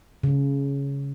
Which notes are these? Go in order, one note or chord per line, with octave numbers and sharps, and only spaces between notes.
C#3